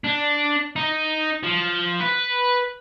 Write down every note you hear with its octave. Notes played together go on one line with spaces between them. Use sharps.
D4
D#4
F3
B4